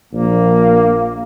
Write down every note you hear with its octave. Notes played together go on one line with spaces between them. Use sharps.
A#1 A#3